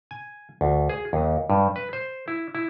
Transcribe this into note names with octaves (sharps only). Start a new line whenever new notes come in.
G#5
D2
G#4
D#2
G2
B4
C5
E4
E4